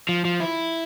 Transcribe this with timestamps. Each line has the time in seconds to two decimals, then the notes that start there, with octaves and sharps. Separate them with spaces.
0.09 F3
0.25 F3
0.40 E4